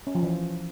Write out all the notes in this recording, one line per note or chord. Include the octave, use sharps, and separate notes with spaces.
C#4
F3
E3